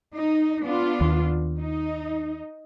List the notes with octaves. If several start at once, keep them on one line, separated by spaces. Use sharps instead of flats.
D#4
B3 D4 F4
D#2
D#4